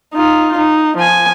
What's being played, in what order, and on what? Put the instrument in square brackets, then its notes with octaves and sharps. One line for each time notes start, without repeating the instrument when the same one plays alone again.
[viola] D#4 F4
D#4
F3 G#5